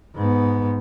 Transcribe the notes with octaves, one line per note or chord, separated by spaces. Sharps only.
G#2 B3